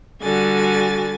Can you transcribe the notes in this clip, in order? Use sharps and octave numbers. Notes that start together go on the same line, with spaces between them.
D3 G3 F#4 G#5 A6